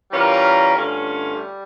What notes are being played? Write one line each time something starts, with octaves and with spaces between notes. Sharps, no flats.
E3 G3 C#4 F4 A#4
G2 D3 A3 C#4 F4
G3